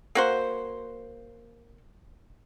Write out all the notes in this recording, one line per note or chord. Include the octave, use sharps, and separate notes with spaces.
A#3 F#4 C5